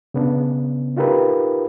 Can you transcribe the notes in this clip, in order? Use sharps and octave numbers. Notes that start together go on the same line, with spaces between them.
C#3 B3 D4
D#4 F4 G4 A#4 B4